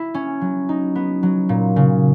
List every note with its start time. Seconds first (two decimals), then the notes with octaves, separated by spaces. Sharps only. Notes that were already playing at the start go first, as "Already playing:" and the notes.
Already playing: E4
0.14 C#4
0.41 F#3
0.69 D#4
0.95 B3
1.23 F#3
1.49 A#2
1.76 C#3